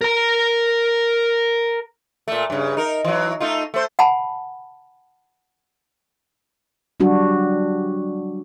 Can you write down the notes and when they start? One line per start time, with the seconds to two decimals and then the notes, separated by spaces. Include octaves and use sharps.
0.01 A#4 A#5
2.28 A#2 A3
2.50 G2 C#3
2.77 D#4 A#4
3.05 E3 F#3
3.40 A3 D#4 F4
3.74 A3 C5
3.99 F#5 G#5 A5 B5
7.00 F#3 G3 D4 F#4